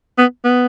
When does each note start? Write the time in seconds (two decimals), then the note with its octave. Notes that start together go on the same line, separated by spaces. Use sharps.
0.18 B3
0.44 B3